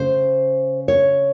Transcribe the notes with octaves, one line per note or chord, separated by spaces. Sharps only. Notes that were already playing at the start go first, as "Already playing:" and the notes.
Already playing: C#3 C5
C#5